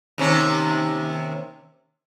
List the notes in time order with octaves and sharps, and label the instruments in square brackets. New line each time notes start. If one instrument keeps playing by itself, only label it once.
[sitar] D#2 C3 C#4